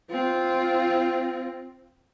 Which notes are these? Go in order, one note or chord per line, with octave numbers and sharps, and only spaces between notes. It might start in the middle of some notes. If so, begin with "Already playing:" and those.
C4 F4